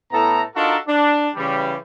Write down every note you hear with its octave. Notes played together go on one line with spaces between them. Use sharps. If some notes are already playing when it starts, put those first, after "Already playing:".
A2 B3 E4 A4 A#5
D4 D#4 F4 F#4 A4 A#4
D4
C#3 E3 G3